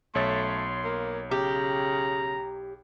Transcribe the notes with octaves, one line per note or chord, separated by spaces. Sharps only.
B1 A3 C#5 C6 A6
A#3
C#3 G4 A#5